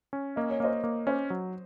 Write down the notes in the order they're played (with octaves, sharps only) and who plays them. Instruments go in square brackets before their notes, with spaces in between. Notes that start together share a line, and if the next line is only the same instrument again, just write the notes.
[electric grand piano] C#4
[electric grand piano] A#3 [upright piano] D#5
[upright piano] C#5
[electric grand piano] A#3 [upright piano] C5 D#5
[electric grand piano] A#3
[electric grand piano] C#4 [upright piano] C5
[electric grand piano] F#3